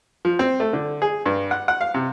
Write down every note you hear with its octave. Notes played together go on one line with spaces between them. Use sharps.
F3
C4
A3
D3
G#4
G2
F#5
F#5
F5
C3